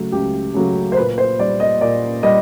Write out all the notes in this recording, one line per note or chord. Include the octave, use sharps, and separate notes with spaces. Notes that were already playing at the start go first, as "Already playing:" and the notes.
Already playing: C#3 F#3 A3
C#2 G4
C#3 F#3 A3
C5
A#2 B4
C5
G3 D5
D#5
A#2 D5
G3 D#5